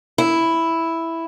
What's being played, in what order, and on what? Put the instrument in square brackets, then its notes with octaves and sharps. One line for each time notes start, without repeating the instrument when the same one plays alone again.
[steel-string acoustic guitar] E4